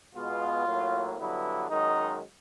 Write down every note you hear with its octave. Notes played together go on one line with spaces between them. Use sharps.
B2 G#3 B3 F4
A2 F#3 A#3
G2 D3 F#3 B3 E4
F#2 D#3 G#3 D#4